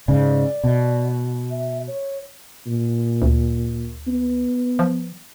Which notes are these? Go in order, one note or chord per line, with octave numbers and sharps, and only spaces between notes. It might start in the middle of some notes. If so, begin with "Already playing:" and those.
G#2 C#3 D5
B2
E5
C#5
A#2
D2
B3
F3